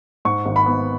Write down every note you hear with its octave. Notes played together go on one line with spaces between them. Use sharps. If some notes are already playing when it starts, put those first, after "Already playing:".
G#2 C#6
G#1
B5
B3